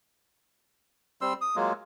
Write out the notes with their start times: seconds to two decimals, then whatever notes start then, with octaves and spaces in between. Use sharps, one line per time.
1.21 G3 C4 C6 E6
1.41 D#6
1.56 F#3 G#3 A#3 F4